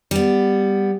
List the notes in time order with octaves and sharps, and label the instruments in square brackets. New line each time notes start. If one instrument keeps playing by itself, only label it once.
[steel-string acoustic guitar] G3 B3